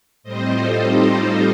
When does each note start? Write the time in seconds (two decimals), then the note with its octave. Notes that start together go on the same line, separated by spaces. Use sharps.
0.23 A2 G3 C4 C5 D#5
0.52 F4 A4
0.80 D#4 G4